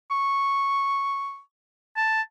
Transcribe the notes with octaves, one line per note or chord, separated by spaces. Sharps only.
C#6
A5